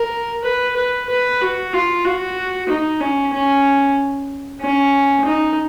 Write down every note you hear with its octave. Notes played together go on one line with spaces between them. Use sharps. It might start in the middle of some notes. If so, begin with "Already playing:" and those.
Already playing: A#4
B4
B4
B4
F#4
F4
F#4
D#4
C#4
C#4
C#4
D#4